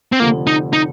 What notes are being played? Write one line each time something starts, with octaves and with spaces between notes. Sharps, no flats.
C4
F1 F2 D3 F3 A#3
D#4
D#4